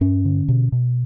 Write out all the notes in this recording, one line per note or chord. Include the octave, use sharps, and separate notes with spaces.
G2 C#4
D3
B2
B2